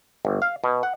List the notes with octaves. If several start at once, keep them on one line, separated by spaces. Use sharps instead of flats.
G1
F5
B2
F#5